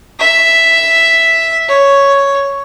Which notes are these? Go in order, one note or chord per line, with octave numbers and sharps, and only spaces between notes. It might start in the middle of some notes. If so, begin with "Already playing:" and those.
E5
C#5